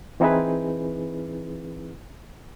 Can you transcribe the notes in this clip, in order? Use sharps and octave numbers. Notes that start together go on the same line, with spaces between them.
E3 C4 D#4 E4 G#4 B4